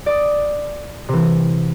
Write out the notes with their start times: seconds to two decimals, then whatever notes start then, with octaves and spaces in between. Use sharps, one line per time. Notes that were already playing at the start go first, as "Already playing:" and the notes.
0.06 D5 D6 D#6
1.09 C3 E3